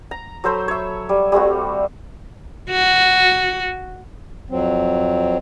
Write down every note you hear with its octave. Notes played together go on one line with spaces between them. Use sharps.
A#5
F#3 A4 C5 B5
C#5 E5
G3
G3 A3 C4 F#4
F#4
F2 F#3 C4